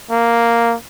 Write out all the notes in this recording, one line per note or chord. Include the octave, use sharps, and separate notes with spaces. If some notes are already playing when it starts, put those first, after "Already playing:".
A#3